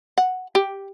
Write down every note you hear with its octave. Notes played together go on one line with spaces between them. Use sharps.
F#5
G4